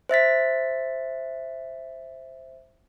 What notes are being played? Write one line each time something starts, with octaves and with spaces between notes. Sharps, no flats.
C5 E5 A6 B6